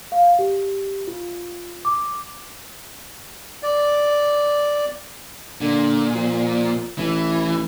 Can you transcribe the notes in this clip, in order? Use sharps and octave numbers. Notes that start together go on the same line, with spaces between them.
F5
G4
F4
D6
D5
A#2 D3
F3
A1 E3